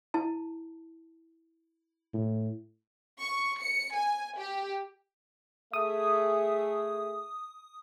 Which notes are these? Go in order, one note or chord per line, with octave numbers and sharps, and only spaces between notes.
E4 A5
A2
C#6
C#7
G#5
G4
A3 G#4 E5 D#6